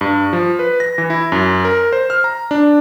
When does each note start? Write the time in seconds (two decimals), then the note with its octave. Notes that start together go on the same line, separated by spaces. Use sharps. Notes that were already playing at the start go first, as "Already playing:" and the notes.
0.01 G2
0.33 F3
0.59 B4
0.80 A#6
0.98 E3
1.10 E4
1.32 F#2
1.65 A#4
1.92 C5
2.10 F6
2.24 A#5
2.51 D4